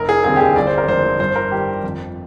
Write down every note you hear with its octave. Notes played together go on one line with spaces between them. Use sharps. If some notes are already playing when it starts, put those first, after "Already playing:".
Already playing: F1 A#4
G#4
D#2 D3 G3 C4 G#4
G4
G#4
G1 D5
C5
A#4
F2 D3 G#3 C5
G2 C5
A#4
D#3 G3 G4
F2